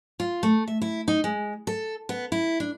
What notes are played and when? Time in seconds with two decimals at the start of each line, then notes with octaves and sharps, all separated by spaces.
0.20 F4
0.43 A3
0.67 E5
0.82 E4
1.08 D#4
1.24 G#3
1.67 A4
2.09 B3
2.32 E4
2.60 D4